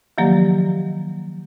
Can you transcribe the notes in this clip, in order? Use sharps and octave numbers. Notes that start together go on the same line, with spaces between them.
D#3 F3 F#3 A#3 G4 D5